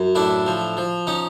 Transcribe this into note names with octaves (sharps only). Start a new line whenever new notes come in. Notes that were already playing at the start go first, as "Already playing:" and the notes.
Already playing: F#2
A2 D4 E4
F3
F3
C#4 D#4